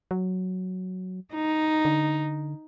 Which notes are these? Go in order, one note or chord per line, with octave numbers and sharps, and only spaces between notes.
F#3
D#4
D3